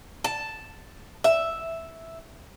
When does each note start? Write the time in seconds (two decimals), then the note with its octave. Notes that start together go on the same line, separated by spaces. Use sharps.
0.24 A5
1.24 E5